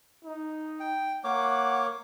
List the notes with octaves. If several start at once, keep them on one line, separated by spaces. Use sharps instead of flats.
D#4
G5
A#3 C#5 F#5 D6